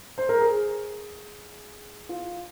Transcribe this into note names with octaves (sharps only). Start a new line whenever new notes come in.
C5
A#4
G#4
F4